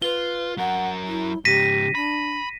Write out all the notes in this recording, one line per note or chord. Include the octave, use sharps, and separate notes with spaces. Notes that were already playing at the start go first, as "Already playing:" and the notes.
F4 B4 G7
F#3 A#4 F#5
E4
G#2 C#3 G4 A#6 B6 D#7
D4 B5